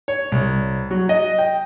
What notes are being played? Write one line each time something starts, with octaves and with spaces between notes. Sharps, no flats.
C#5
C2
F#3
D#5
G5